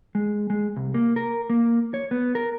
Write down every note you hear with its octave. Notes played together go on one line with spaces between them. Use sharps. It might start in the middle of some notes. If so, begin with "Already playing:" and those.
G#3
G#3
C2
A#3
A#4
A#3
C#5
B3
A#4